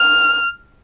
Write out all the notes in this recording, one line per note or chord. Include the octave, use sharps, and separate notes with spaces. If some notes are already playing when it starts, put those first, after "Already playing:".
Already playing: F6